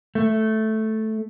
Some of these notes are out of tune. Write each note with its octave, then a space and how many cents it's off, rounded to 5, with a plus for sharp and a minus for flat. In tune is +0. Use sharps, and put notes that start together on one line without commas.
A3 -5